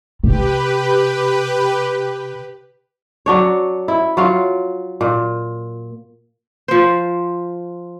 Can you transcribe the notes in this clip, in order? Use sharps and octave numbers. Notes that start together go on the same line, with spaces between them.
C3 G4 B4
F#3 D4 C#5
E4
F#3 F4 F5
A#2
F3 C5